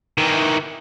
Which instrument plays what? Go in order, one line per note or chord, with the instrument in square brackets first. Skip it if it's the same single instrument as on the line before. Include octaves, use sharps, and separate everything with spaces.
[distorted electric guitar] D#3 E3